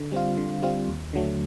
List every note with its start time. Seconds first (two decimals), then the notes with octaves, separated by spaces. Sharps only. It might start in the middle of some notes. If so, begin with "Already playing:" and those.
Already playing: D3
0.12 G3 C4 F4
0.37 D3
0.62 G3 C4 F4
0.88 D#2
1.13 D3 F#3 A3